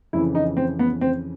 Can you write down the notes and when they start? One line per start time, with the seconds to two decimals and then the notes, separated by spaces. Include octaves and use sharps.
0.13 F2 C#3 E3 E4
0.35 D#4
0.57 C4
0.79 B3
1.01 C4